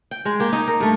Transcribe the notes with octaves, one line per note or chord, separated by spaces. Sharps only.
G5
G#3
A#3 G4
D#4
A#4
G2 A3